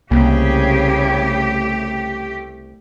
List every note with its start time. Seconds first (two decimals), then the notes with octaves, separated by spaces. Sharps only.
0.11 C2 C#3 A3 A#3 G4